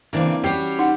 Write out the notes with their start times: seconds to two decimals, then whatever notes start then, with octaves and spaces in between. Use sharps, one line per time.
0.13 C#3 E3 A#3 C4 D4
0.44 G3 C#4 F#4 G4 C#5 C7
0.79 D#4 F#5